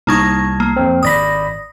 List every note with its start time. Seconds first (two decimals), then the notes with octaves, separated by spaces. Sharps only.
0.07 C2 A#3 D#4 A5 C#6 G#6
0.60 A#3
0.76 F2 C4
1.03 G#1 D5 B5 D#6 A#6 B6